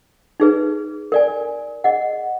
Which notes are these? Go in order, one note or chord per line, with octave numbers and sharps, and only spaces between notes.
D#4 G#4 B4
A#4 D5 G#5
G#4 D#5 F#5